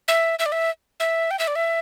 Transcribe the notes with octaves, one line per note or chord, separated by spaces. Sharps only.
E5
E5
D5
E5
E5
G5
E5
D5
E5